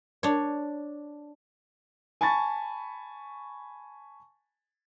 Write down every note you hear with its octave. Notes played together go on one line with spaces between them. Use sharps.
D4 C#5
G#5 A5 B5 C#6 A6